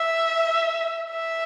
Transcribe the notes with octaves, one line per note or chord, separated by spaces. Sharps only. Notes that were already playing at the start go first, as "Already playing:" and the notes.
Already playing: E5
E5